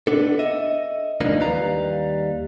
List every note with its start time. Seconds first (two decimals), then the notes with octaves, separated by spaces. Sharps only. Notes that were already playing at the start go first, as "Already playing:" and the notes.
0.07 B3 D4 A4
0.39 D#5 E5
1.21 G#2 E3 F3 A#3 D4 D#4
1.40 D#2 G3 B4 F5 A#5